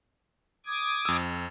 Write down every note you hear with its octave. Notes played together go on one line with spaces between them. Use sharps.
D6 D#6 G#6
F2 E6